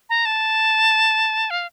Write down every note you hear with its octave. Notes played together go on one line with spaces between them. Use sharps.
A#5
A5
F5